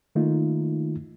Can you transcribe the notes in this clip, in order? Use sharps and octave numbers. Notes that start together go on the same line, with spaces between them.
D#3 A3 A#3 D#4 F4